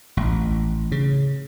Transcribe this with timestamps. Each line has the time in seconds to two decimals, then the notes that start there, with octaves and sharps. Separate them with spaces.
0.17 A1
0.92 C#3